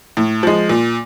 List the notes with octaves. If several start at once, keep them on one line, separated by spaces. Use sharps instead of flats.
A2
F3 G#3
A#2